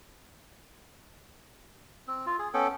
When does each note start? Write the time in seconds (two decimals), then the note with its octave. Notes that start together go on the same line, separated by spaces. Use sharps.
2.08 C4
2.26 F4
2.39 G#4
2.54 B3 C#4 A4 G5